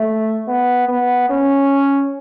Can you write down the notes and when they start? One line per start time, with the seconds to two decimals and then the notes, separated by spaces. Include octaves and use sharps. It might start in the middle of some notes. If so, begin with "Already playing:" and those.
Already playing: A3
0.48 B3
0.89 B3
1.30 C#4